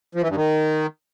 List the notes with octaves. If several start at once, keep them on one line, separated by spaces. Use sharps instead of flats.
F3
E3
G2
D#3